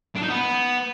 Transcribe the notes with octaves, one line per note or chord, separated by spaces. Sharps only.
D4
D#4
B3